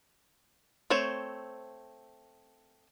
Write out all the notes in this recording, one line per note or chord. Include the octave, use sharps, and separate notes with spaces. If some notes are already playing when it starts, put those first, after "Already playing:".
A3 C4 C5 C#5